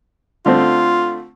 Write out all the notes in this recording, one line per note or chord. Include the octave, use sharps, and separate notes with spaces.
D3 A3 C4 F4